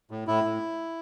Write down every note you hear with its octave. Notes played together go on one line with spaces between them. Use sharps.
A2
A2 E4
A2